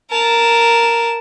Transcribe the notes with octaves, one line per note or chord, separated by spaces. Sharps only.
A#4 A5